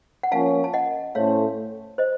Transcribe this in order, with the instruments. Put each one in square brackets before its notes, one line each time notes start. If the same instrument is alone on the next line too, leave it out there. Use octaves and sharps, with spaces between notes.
[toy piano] F#5
[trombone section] F3 A#3 C#4 [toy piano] F5 A5
[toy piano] A5
D#5 F#5
[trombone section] A2 A3 C#4 A4 C5 [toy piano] C#5 F5
[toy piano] C5 D#5